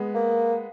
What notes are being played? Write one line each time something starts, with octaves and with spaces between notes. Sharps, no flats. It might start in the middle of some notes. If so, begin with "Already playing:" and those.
Already playing: G#3 B3
A#3